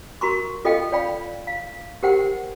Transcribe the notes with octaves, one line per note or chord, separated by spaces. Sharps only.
F#4 A#4 A#5 C6 C#6
F4 A4 D#5 F5 G5
C#5 D5 F5 G5 B5
F5
G4 A#4 C5 F#5 G5